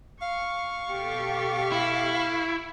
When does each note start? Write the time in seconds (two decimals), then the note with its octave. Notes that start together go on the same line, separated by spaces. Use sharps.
0.22 F5 C#6
0.90 B2 G4 A4
1.72 E4